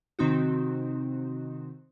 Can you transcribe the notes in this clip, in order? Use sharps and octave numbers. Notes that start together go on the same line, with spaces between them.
C3 D#3 C4 D#4 F#4